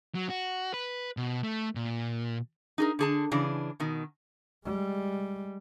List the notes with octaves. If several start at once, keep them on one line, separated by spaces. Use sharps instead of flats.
F#3
F#4
B4
B2
A3
A#2
D#4 G#4 A#4
D3 G#4 A5
C#3 E3 D4 G#4
B2 D#3
G3 G#3